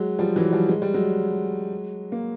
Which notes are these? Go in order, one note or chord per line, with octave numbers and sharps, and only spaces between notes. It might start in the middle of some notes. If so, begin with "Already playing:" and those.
Already playing: F#3 G#3
F3 G3
E3 F#3
F3 G3
G#3
G3
F#3 G#3
A#3